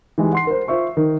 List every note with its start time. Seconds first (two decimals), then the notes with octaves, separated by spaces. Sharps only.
0.18 E3 G#3 D#4 G4
0.33 F#5 C6 C7
0.47 A#4 C5
0.68 F4 C5 E5 C#6
0.97 D#3